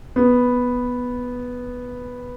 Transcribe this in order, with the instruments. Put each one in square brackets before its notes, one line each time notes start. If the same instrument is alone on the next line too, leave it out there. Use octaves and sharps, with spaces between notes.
[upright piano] B3